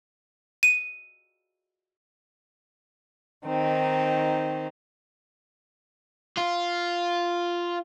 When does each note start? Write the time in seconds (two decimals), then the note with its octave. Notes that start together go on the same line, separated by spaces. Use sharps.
0.63 D#7
3.45 D#3 C4 D#4
6.38 F4